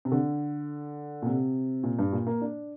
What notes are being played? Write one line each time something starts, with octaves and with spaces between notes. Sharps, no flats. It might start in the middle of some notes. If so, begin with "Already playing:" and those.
C3
D3
A#2
C3
A#2
G2
A#2
A#3
D4